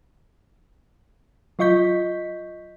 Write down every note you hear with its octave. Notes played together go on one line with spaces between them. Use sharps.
F#3 F4 D#5 C#6 G6 B6